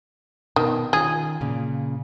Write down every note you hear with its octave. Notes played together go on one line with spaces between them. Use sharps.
B2 D#3 A5
D#3 C#4 F4 G#4
A#2 C#3